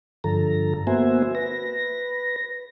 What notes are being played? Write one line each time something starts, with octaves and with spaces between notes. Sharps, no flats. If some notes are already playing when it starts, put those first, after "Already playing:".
G2 D3 F3 A4 A#5
A#3 B3 F#4 C5 E5 G#5
B4 A#6